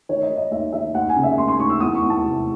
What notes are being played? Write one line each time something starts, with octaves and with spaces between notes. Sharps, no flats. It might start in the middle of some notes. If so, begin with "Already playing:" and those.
D#3 C#5
D#5
D#3
D#5
D#2 E5
D#3 E5
D#2 F#5
G#5
C#3
E5
D#2 C6
C6
D#2 C#6
E6
E2 D#6
C#6
E2
A5
C3